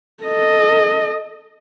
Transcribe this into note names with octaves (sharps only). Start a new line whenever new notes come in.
A4 D#5